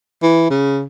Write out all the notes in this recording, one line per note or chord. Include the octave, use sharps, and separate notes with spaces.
E3
C#3